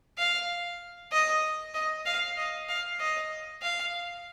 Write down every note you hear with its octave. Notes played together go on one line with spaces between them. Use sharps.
F5
D#5
D#5
F5
D#5
F5
D#5
F5